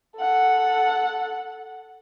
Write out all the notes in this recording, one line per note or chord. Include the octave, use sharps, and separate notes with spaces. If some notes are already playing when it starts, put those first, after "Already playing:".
A4 F#5